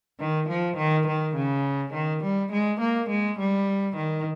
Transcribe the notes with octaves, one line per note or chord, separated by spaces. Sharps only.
D#3
F3
D#3
D#3
C#3
D#3
G3
G#3
A#3
G#3
G3
D#3